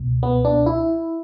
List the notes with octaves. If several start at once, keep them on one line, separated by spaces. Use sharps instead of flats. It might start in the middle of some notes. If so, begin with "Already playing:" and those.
Already playing: C#2 B2
B3
D4
E4